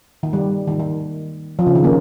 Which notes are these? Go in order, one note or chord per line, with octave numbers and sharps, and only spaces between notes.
D#3
G3
D#3
D#3
F3
C#3
D#3
A#3 C#4